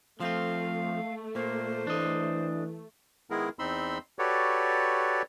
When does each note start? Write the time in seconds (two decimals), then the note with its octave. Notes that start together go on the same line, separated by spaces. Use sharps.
0.20 F3 A3 C4 F4 F5
1.35 A#2 A#3 C5
1.87 E3 D4 D#5
3.30 D#3 G#3 B3 E4 G#4 A#4
3.59 E2 C4 D#4 B5 C6 E6
4.19 F#4 G4 A4 B4 C#5 D5